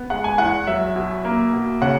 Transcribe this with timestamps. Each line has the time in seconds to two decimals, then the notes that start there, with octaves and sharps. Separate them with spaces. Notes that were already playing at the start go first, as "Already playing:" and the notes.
Already playing: B3
0.10 G#3 F#5
0.24 G#5
0.38 E2 F#5
0.67 F#3 E5
0.96 B2
1.25 A#3
1.53 B2
1.82 C#3 F#5